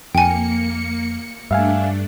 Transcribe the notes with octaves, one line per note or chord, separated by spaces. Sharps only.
F2 A#3 G5 G#5 C#7
G2 A3 D4 E5 F5 G#5